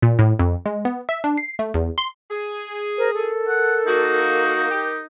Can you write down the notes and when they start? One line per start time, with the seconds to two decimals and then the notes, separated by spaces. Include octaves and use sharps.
0.02 A#2
0.19 A2
0.39 F2
0.66 G#3
0.85 B3
1.09 E5
1.24 D4
1.38 C7
1.59 A3
1.74 E2
1.98 C6
2.31 G#4
2.98 A#4 C5
3.14 A4 A#4
3.48 F#5
3.87 A#3 D#4 F#4
4.71 G4